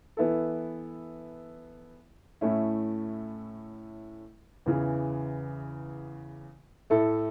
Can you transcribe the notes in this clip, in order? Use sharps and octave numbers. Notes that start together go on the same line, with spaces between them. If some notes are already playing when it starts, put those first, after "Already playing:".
E3 B3 E4 A4
A2 A3 C#4 E4
E2 C#3 E3
A2 A3 E4 A4